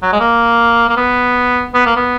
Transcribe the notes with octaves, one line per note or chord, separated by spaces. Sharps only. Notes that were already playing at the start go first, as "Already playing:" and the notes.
F#3
G#3
A#3
A#3
B3
B3
A#3
B3